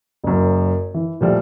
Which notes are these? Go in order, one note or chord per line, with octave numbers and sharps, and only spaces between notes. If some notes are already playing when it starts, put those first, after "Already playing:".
F#1 F#2
E3
A#2 F3 G3 A3